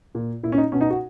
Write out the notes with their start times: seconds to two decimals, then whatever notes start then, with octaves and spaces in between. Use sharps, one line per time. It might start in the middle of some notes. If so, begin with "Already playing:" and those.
0.15 A#2
0.43 A#2 E4
0.52 C#4
0.58 D#4
0.72 B2 C#4
0.81 D#4
0.90 F#4